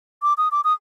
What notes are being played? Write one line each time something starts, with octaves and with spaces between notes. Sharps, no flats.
D6
D#6
D6
D#6